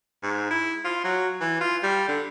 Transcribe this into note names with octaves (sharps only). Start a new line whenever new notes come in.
G#2
E4
F4
F#3
E3
F4
G3
D3